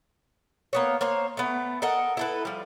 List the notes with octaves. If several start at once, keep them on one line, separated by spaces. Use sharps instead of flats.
A#3 B3 C#5
A#3 C5 C#5
A3 B3
A4 A#4 D#5 F#5
E4 A4 B4
F3 G3